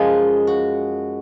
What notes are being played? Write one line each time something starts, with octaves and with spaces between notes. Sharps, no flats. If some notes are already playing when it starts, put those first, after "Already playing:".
Already playing: F#2 F3 G#3
F#4